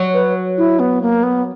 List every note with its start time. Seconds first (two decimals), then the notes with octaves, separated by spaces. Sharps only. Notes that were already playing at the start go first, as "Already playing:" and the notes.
Already playing: F#3
0.14 B4
0.58 E4
0.79 B3
1.02 A#3
1.23 B3